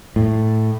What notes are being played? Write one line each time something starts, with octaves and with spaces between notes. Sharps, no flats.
A2